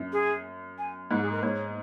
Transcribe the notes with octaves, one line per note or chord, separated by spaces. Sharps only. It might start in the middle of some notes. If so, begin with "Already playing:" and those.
Already playing: F#2
G#4
G#5
G#2 F#5
G#4
A#4
G#2 C#5